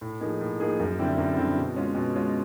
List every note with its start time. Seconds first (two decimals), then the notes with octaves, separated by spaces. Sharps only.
0.01 A2
0.21 F3 A#3 D#4 G#4
0.41 A2
0.60 F3 A#3 D#4 G#4
0.80 F#2
0.98 D3 G3 C4 E4
1.18 F#2
1.37 D3 G3 C4 E4
1.57 B2
1.75 G#3 C#4 F4
1.95 B2
2.15 G#3 C#4 F4